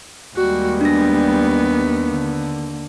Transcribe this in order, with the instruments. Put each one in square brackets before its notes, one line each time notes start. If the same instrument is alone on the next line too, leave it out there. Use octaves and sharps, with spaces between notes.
[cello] D#2 [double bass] G3 G#3 [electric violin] F#4
[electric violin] B3 [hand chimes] D4 A#6
[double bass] D3